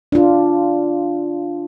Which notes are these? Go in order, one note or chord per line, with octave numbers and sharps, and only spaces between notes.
D4 F4